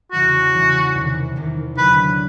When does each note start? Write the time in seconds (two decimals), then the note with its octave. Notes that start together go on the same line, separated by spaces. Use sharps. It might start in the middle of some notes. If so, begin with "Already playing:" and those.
0.12 E2 C#3 E3 G3 F#4
0.53 E2 C#3 E3 G3
0.95 E2 C3 D#3
1.36 E2 C3 D#3
1.75 D#2 D3 F#3 B4